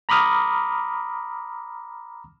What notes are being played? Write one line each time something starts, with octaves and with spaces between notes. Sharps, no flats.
A#5 B5 D6 D#6 F6